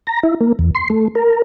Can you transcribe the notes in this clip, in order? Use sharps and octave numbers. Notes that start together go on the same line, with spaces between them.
A#5
E4
A#3
E2
C6
A3
A#4